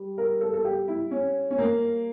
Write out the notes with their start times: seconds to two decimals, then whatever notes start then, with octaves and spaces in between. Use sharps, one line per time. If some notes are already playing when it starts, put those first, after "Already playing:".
Already playing: G3
0.18 A#4
0.41 A4
0.54 A4
0.64 G4
0.88 E4
1.11 C#4
1.51 C#4
1.58 A#3